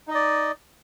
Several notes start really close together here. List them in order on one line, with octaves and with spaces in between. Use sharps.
D#4 D#5 D5